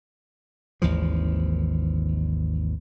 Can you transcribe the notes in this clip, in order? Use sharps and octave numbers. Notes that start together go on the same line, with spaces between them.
G#1 D#2 E3 F3